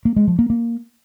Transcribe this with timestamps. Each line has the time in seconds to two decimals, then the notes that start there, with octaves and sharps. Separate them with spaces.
0.05 A#3
0.16 G#3
0.28 F3
0.39 A#3
0.50 A#3